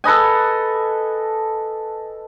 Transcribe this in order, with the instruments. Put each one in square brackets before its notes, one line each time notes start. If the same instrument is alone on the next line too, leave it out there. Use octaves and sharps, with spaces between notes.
[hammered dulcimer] A4 B4 D#5 G#5